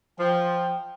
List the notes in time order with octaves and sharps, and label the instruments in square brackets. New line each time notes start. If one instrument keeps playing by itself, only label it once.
[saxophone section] F3 [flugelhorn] G5